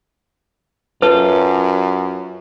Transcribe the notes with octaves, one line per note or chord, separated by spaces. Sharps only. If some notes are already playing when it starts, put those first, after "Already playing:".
F#2 F4 A4 B4